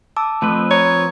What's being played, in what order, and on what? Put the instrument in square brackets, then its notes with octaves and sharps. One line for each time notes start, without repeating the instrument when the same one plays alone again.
[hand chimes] A5 D6 E6
[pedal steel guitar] F3 C4 B4 [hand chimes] A3
[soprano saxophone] C#5 [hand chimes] A#5